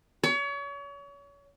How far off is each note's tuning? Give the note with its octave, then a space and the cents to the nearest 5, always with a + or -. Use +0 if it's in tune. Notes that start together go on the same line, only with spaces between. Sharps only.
C#5 +35